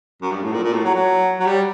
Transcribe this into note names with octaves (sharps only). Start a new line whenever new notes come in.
F#2
G2
A2
A#2
A#2
A2
F#3
F#3
F#3
G3